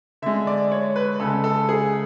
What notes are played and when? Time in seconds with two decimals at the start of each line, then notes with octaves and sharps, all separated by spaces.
0.22 D3 G#3 E5
0.47 D5
0.72 C#5
0.96 B4
1.20 C#3 G#3 A4
1.44 A4
1.69 G#4